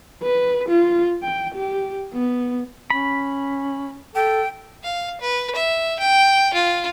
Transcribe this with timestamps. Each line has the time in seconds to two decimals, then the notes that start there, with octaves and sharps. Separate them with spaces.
0.23 B4
0.69 F4
1.23 G5
1.55 G4
2.14 B3
2.90 C#4 B5
4.15 A4 G5
4.83 F5
5.21 B4
5.55 E5
5.99 G5
6.53 F4